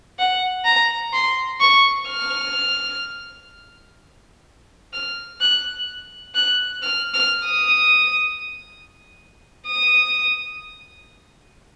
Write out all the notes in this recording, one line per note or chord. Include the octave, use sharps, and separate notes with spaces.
F#5
A#5
C6
C#6
F6
F6
F#6
F#6
F6
F6
D#6
D#6